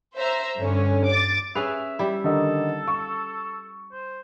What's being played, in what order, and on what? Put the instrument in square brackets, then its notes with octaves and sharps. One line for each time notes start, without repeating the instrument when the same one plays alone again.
[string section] C5 E5 A#5
G2 D3 C#4
D6 A6
[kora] C#4 G#4 B4 [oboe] E5 [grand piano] F7
[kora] G3 E4
[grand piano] D3 D#3 D#4 [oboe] A4
[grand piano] C#6
[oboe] C5